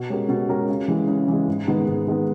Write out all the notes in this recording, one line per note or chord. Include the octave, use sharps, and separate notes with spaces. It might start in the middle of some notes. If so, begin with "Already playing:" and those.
Already playing: B2
G#3 C#4 G4 A#4
B2
G#3 C#4 G4 A#4
C#3
E3 G#3
C#3
E3 G#3
G#2
D#3 G#3 B3 D#4
G#2
D#3 G#3 B3 D#4